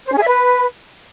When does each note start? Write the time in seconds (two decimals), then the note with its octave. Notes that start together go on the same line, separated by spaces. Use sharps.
0.06 C5
0.12 C#4
0.17 G#4
0.22 E5
0.27 B4